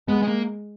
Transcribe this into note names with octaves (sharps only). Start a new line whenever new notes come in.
G#3 B3
G#3
A#3